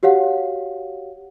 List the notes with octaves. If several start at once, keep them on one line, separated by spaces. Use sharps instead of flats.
F#4 G4 C#5 F5 F#5